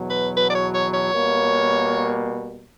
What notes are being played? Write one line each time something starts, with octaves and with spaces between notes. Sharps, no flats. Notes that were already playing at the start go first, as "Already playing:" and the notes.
Already playing: E2 B2 F#3
B4
B4
D5
C#5
C#5
C#5
B2 G3 A#3